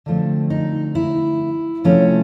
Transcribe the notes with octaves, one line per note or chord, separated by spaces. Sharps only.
D3 F3 A3 C4
D#4
E4
C3 F3 A3 C#4